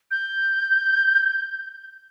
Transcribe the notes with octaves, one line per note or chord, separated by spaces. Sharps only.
G6